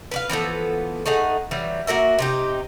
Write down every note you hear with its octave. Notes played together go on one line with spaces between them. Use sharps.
B4 D5 F5
E3 F3 B3 A4
A3 D#4 G#4 F#5
E3 F#3 G3
A#3 F#4 A#4 E5
C3 D#4 G4